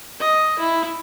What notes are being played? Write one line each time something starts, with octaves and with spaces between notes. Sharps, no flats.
D#5
E4